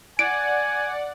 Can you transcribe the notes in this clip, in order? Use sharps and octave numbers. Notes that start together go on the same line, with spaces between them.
D5 F#5 G#5 D7